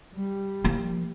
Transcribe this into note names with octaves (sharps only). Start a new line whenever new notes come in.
G3
F3 A#3